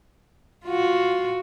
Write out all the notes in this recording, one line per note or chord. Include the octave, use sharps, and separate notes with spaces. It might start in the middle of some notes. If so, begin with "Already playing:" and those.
F4 F#4